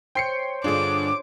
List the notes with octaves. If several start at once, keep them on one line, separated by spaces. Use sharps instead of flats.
C5 C#5 G5 C7 C#7
G2 D3 D4 F4 G#4 D6